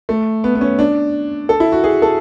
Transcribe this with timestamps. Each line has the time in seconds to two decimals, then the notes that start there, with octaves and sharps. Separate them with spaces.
0.09 A3
0.44 B3
0.55 B3
0.61 C#4
0.79 D4
1.49 A4
1.60 E4
1.72 F#4
1.84 G#4
2.02 A4